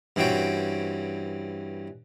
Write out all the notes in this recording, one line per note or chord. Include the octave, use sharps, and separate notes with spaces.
G2 E3 C4 C#4 F#4 G5